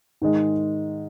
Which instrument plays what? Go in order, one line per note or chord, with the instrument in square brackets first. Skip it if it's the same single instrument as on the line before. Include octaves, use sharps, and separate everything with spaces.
[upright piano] G#2 D#3 G#3